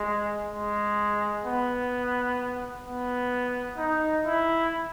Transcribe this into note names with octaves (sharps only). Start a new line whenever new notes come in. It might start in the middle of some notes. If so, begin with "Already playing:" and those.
Already playing: G#3
G#3
B3
B3
D#4
E4